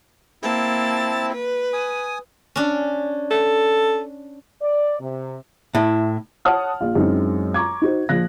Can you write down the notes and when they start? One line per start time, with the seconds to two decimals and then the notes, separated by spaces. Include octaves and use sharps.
0.43 A#3 C4 E4 A5
1.33 B4
1.73 G#5 D#6
2.56 C#4 D4
3.31 A4
4.61 D5
5.00 C3
5.75 A2 E4
6.45 C#5 F#5 A5 D#6 F6
6.81 A#1 F4
6.95 F#2 G#3 C4 D#4 E4
7.54 A#5 C#6 D6 G#6
7.82 D#4 F#4 C5
8.09 A#1 F3 F#6 A#6